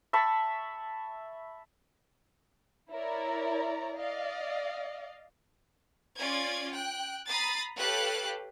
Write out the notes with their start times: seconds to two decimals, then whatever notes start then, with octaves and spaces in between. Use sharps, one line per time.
0.13 E5 A5 B5 C#6
2.91 E4 A#4 C#5 D5 A#5
3.96 D5 D#5 F5
6.19 C#4 F4 D5 G#6
6.72 G5 F#6
7.28 A#5 B5 D#6 A6 C7
7.77 G4 A4 B4 C#5 F5 F#6